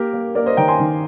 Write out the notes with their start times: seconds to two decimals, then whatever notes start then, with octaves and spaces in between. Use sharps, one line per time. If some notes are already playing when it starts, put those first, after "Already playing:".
Already playing: A#3 G4 A#4
0.13 A#3
0.35 A#3 A#4 D5
0.46 C5 D#5
0.57 D#3 G5 A#5
0.68 G#5 C6
0.80 D#3